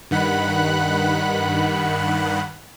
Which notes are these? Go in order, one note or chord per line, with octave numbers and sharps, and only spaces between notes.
G2 D#3 F#5 B5 F#6